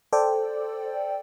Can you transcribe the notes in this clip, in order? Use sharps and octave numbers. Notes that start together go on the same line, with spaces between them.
A4 C5 D5 G5